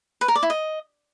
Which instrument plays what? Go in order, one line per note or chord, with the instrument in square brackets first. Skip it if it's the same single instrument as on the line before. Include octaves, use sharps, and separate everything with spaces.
[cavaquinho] B4
A#4
D5
E4
D#5